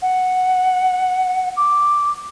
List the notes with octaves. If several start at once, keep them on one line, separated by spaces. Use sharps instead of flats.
F#5
D6